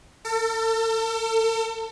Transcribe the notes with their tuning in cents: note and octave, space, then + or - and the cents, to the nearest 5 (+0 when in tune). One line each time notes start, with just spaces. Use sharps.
A4 +40